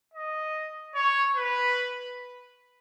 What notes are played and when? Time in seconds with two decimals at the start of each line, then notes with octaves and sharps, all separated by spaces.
0.14 D#5
0.95 C#5
1.36 B4